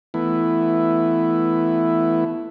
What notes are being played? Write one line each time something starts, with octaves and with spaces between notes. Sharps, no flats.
E3 A3 B3 E4